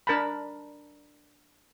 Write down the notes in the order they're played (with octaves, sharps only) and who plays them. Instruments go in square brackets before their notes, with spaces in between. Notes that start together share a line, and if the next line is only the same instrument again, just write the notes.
[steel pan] D4 A#4 A5 B5